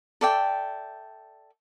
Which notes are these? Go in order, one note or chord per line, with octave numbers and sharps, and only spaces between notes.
A4 D5 E5 G5